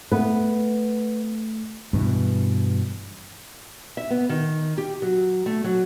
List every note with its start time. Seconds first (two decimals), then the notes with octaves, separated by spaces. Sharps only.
0.12 A3 B3 B4
1.93 G2 B2 E3
3.97 E5
4.10 B3
4.29 D#3
4.78 G4
5.02 F#3
5.46 A3
5.64 F#3